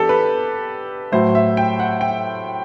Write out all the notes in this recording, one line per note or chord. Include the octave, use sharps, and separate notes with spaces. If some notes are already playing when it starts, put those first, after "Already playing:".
Already playing: E3 B3 D4 G4 A4
B4
A2 F#3 A3 C5
E5
G5
F#5
G5